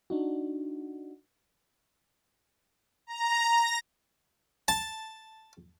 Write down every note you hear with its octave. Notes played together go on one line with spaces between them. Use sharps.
D4 D#4 F#4
A#5
A#6
A5